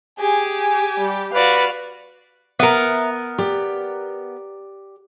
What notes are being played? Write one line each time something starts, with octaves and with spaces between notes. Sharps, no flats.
G4 G#4 G#5
G3
F#4 B4 D5 F5
B3 A#4 E5 A#5
G4 D5